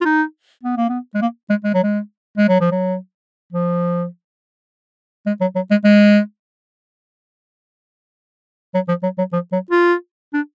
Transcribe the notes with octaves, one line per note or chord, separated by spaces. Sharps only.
F4
D#4
B3
A#3
B3
G#3
A#3
G#3
G#3
F#3
G#3
G#3
F#3
F3
F#3
F3
G#3
F#3
F#3
G#3
G#3
F#3
F3
F#3
F#3
F3
F#3
F4
D4